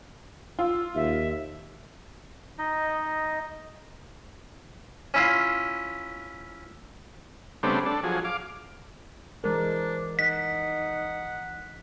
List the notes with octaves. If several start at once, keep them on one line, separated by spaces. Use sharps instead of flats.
F4 E6
D#2 E5
D#4 D#5
C#4 E4 F4
C#3 G3 A3 B3 C4 D4
D4 A4
F3 F#3 G#4
F5 D6
E3 G#3 D4 A#4 C5
D#4 F#5 B6